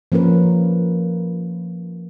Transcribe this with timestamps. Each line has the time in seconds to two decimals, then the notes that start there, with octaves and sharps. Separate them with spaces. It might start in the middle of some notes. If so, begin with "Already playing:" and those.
0.12 F3 A#3 C#4 A#4 B4